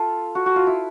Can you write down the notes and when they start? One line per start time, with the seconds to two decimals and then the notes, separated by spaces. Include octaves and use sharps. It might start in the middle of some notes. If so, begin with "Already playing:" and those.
Already playing: F4 A4
0.35 F#4
0.46 F#4
0.56 F4
0.67 E4